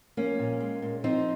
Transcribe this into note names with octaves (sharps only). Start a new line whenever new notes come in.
F3 A#3 C#4
A#2
G#3
A#2
F3 C4 D#4